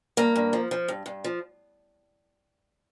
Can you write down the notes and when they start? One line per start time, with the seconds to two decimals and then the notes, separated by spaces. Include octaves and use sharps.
0.17 G2 A#3
0.36 G2
0.53 F3
0.71 F3
0.88 G2
1.06 G2
1.24 F3